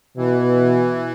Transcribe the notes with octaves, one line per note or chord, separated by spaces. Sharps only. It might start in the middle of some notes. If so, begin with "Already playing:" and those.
B2 E3